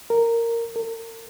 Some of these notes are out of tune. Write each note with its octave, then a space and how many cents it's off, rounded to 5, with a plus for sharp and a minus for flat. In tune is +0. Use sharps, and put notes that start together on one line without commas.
A#4 -10
A#4 -40